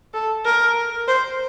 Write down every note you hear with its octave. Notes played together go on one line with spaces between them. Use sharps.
A4
A#4
C5